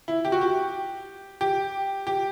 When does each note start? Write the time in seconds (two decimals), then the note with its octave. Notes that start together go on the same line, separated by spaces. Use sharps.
0.08 E4
0.25 G4
0.32 F#4
0.41 G4
1.41 G4
2.07 G4